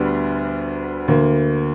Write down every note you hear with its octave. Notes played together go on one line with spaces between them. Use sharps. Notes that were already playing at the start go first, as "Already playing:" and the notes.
Already playing: D2 D3 G3 B3 D4
D2 D3 A#3